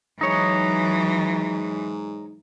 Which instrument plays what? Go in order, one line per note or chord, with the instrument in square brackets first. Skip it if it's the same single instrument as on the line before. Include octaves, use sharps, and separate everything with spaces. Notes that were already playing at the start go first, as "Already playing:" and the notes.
[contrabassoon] G#2 [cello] E3 F#3 [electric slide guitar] D#4 C#5